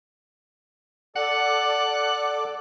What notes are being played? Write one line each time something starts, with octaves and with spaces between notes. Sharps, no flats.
A4 D5 F#5 D6